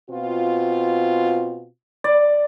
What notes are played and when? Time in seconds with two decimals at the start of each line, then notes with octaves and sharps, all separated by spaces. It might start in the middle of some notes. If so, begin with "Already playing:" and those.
0.10 B2 C4 F4
2.04 D5